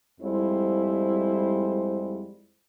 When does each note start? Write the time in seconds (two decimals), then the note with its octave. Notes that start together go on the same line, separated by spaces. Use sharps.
0.21 F2 G3 G#3 E4 C5